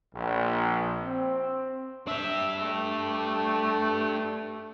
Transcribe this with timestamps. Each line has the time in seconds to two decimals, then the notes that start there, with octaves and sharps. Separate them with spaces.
0.14 A#1
1.02 C4
2.07 D4 G4 E5
2.60 A3